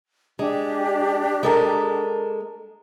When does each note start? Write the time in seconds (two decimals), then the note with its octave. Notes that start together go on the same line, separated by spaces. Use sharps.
0.39 G#3 D4 G4
1.43 G#3 A4 A#4